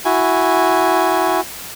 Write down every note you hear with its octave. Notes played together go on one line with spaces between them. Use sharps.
E4 F#4 G#5